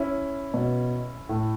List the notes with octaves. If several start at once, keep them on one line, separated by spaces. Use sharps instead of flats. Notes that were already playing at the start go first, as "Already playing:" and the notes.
Already playing: C#4 E4
B2
A2